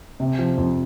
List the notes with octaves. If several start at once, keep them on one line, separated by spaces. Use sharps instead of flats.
C3
F3
F2